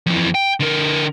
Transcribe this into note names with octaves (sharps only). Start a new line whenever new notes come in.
F2 E3
G5
D3 A#4